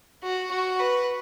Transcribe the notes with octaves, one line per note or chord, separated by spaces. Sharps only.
F#4
F#4
B4